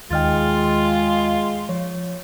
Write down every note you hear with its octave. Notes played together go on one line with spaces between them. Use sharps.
D#2 D#3 G#3 F4 D#5 G5 F6 A6
F3 C#5